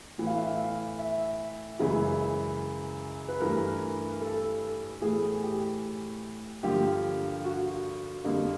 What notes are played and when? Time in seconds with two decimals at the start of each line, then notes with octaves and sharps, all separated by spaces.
0.18 A2 E3 A3
0.27 F5
0.37 E5
0.47 F5
0.98 E5
1.79 F#2 C#3 E3 G#3
3.28 B4
3.40 G2 E3 A3 A#4
4.21 A4
5.02 A2 E3 A3 G#4
5.42 G4
6.63 G2 D3 F3 A#3 G4
7.44 F#4
8.24 F2 D3 G3 A#3